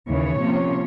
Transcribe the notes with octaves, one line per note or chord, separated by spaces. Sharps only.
D#2 C#3 E3 C#5
C3 F3 A#3 C#4